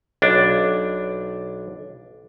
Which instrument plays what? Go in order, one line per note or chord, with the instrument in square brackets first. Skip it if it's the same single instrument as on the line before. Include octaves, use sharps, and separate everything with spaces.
[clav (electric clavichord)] B1 D4